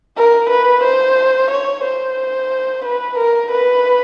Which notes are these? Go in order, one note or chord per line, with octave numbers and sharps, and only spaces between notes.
A#4
B4
C5
C#5
C5
B4
A#4
B4